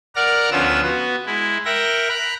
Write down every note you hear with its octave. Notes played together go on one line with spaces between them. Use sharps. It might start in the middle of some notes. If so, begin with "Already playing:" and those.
A#4 D5 F#5 A#5 F6
D2 F3 B3 C#4 F4 E6
B3 F#4
G#3 E4
A#4 E5 F#5 G5 A#6
A#5 B5 F#6